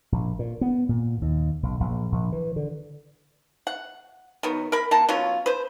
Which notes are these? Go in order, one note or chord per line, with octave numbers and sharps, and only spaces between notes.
A#1
A#2
B3
A#2
D#2
B1
A#1
A#1
E3
D3
F#5
D#3 F#3 B3
A#4 B5
A#3 F#5 A5
F#3 B3 C#4 F4
B4 C5